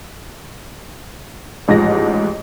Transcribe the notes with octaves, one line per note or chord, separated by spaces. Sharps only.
A1 G#2 F3 A#6